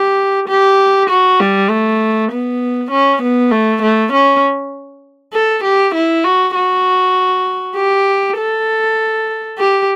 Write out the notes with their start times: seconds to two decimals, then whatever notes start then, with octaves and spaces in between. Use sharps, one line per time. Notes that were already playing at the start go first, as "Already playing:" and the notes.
Already playing: G4
0.48 G4
1.10 F#4
1.40 G3
1.70 A3
2.31 B3
2.91 C#4
3.22 B3
3.52 A3
3.82 A3
4.13 C#4
5.33 A4
5.64 G4
5.95 E4
6.25 F#4
6.55 F#4
7.76 G4
8.37 A4
9.58 G4